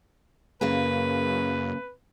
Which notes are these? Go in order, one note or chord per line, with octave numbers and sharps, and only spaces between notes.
F#2 C#3 A#3 G#4 B4